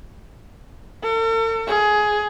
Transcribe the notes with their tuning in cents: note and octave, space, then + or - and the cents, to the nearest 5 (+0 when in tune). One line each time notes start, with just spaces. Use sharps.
A4 +45
G#4 +15